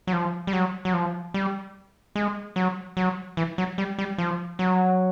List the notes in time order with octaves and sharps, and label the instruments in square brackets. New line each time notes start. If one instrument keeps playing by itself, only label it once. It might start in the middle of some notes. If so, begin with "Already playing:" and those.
[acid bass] F#3
F3
G3
F#3
F#3
F3
G3
G#3
F#3
F#3
E3
F#3
G3
G3
F3
F#3